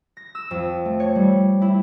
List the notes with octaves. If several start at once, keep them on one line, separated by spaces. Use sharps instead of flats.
A#6
E6
F2
A3
C#5
G3
E4